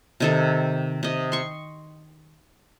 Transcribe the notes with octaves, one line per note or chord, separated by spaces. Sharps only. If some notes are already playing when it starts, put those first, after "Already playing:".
C3 D#3 A4
C3 D#5
C6 C#6